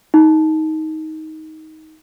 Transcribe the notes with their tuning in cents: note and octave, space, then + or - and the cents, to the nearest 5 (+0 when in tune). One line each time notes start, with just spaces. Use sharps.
D#4 +15